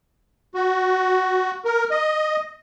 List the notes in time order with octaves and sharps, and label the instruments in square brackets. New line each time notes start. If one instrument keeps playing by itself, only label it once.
[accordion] F#4
A#4
D#5